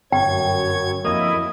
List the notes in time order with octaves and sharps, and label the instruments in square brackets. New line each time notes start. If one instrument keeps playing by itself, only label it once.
[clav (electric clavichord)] G1 [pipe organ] F#2 G#6 [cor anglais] C#5 [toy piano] G5
[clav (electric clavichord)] F2 A#3 [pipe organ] E4 [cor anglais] D#5